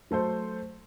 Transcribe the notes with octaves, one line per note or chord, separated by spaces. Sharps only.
F#3 A3 A4 C5